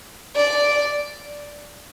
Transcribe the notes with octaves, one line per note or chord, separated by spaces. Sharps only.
D5